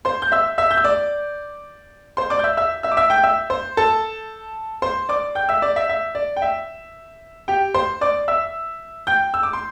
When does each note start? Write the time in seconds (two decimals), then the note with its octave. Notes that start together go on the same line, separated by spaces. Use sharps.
0.05 C5 C6
0.22 G6
0.32 E5 E6
0.58 E5 E6
0.71 G6
0.77 E6
0.84 D5 D6
2.17 C5 C6
2.30 D5 D6
2.39 G6
2.44 E5 E6
2.57 E5 E6
2.83 E5 E6
2.92 D6
2.97 E5 E6
3.10 G5 G6
3.24 E5 E6
3.50 C5 C6
3.77 A4 A5
4.82 C5 C6
5.09 D5 D6
5.35 G5 G6
5.49 E5 E6
5.62 D5 D6
5.76 E5
5.89 E5
6.15 D5
6.36 G5
6.42 E5
7.48 G4 G5
7.74 C5 C6
8.01 D5 D6
8.28 E5 E6
9.07 G5 G6
9.34 E6
9.43 D6
9.53 C6